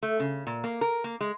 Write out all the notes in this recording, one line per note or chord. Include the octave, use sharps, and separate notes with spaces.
A3
C#3
A#2
A#3
A#4
A#3
G#3